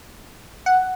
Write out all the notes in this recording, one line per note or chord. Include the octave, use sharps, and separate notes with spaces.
F#5